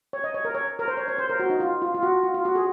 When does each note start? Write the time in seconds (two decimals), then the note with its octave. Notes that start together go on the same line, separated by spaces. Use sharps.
0.13 C#5
0.24 D#5
0.34 C#5
0.45 A#4
0.55 C#5
0.79 A#4
0.88 C5
0.97 C#5
1.08 C#5
1.18 C5
1.30 A#4
1.40 F#4
1.50 D#4
1.60 F4
1.82 F4
1.94 F4
2.03 F#4
2.23 F4
2.34 F4
2.45 F#4
2.55 G#4